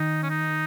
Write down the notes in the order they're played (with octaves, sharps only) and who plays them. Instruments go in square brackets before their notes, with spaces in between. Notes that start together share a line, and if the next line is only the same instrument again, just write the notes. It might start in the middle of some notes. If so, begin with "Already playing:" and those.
Already playing: [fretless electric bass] D#3 [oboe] D#4
[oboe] C#4
D#4